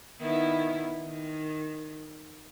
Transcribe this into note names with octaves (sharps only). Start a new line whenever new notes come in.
D#3 B3 E4
D#3